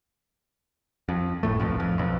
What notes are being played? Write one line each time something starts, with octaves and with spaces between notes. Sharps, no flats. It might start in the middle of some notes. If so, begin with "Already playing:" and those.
F2
G1 A2 A3
D#1 B1 F2
F2
B1 F2